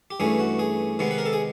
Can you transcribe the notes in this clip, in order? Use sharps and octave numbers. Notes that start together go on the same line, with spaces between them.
G4
G2 E3 A3 C#4 G#4
F#4
G#4
C3 D#3 G#3 B3
B4
A#4
A4
G#4